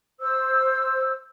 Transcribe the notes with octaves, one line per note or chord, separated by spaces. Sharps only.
C5 E6